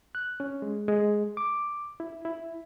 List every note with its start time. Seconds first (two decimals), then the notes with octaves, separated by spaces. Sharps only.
0.15 F#6
0.40 C#4
0.62 G#3
0.88 G#3
1.37 D6
2.00 E4
2.25 E4